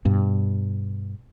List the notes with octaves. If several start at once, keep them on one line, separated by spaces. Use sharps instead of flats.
G2 B2